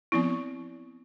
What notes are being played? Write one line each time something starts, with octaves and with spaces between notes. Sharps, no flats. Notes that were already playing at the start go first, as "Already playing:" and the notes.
F3 B3 C4 E4